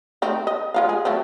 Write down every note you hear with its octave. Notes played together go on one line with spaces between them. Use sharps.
A3 C4 D#4
D#5
G#3 F4 F5
G#4
F#3 A3 C4